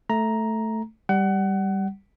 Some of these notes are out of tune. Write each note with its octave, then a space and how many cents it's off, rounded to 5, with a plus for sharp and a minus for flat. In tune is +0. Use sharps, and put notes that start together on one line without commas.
A3 +0 A#5 +5
G3 +0 F#5 +25